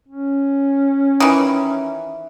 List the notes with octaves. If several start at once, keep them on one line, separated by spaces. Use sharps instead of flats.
C#4
D#3 E3